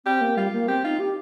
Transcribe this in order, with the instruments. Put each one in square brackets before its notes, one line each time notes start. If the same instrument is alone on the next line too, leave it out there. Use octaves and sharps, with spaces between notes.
[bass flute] C4 [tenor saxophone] G4
[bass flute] A#3
[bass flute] G3 [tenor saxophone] F4
[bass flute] A#3
[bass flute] C4 [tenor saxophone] G4
[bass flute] D#4 [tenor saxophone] F4
[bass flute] G4